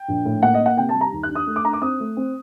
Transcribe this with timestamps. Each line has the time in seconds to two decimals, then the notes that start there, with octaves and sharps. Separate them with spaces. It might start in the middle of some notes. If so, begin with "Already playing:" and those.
Already playing: G5
0.08 A#1
0.25 A2
0.43 A#3 F#5
0.54 D#5
0.60 A#3
0.66 F#5
0.77 C3 G5
0.89 A5
0.94 G3
1.01 A#5
1.13 D#2
1.23 F#6
1.29 D4
1.35 D#6
1.47 A3
1.56 D6
1.64 D4 A#5
1.73 D6
1.82 C4 D#6
2.00 A3
2.17 C4